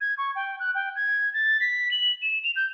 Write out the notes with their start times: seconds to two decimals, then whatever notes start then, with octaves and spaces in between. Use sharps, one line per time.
0.01 G#6
0.18 C#6
0.35 G5
0.59 F#6
0.75 G5
0.96 G#6
1.34 A6
1.60 B6
1.91 F#7
2.21 E7
2.44 F7
2.56 G6